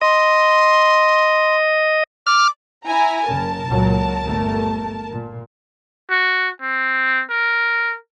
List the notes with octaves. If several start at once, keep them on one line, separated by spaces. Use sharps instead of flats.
D#5 C6
D6 F6
E4 G#5 A#5
F#1 C#3 A#4 A5
C#2 A#2 F#3
G1 A3
A#2
F#4
C4
A#4